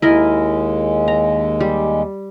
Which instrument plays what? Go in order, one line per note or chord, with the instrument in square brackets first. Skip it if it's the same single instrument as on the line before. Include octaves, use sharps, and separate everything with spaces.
[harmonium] D#2 G#3 [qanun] E4 A#4 D#5
[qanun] A#5
G3